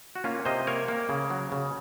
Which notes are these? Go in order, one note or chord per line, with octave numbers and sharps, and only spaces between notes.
F#4
A#3 C#4 F4
C3 C5 D#5
A#3 A#4 C#5
A#3
C#3
F#3
C#3